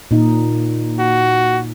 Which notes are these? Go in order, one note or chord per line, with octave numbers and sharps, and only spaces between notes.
A#2 D#4
F#4